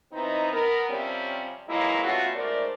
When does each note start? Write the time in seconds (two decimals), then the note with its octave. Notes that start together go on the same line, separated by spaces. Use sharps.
0.13 E3 B3 C4 D#4
0.52 B3 A#4
0.89 C3 F3 G3 C4 C#4
1.69 E3 F#3 G#3 A#3 D#4 E4
2.04 G3 A3 B3 C#4 F4 F#4
2.35 G#2 A3 A#4 C5 D5